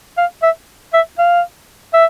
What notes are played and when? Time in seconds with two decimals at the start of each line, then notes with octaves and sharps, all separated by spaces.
0.18 F5
0.43 E5
0.94 E5
1.19 F5
1.94 E5